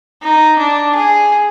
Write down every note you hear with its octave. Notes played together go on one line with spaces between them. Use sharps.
D#4
D4
G#4